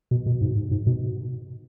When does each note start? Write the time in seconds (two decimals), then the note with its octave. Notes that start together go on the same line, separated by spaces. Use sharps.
0.11 B2
0.26 B2
0.41 G#2
0.71 G#2
0.87 B2